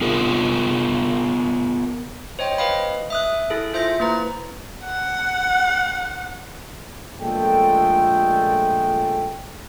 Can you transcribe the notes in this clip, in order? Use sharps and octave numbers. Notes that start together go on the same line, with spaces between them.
B3 F4 G#4 A#4
C5 C#5 D#5 G5
B4 D#5 F5 B5
E5 D#6 F#6
E4 G#4 A4
F4 C5 E5 G6 A#6
A#3 E4 B4 A#5
F#5
A#1 A#2 G#3 A3 A4 G5